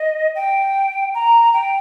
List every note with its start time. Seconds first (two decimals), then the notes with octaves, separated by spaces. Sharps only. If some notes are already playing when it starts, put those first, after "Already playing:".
Already playing: D#5
0.35 G5
1.15 A#5
1.53 G5